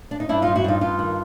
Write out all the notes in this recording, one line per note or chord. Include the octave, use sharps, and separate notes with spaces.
D4
D#4
G2 D4 E4
G2 D#4 F4
E4 F#4
G2 D#4 F4
G2 D#4 F4
D#3